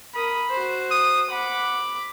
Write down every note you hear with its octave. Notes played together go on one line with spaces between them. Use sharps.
A#4 B5 D#6
F#4 C5
D#6
F#5 B5 D6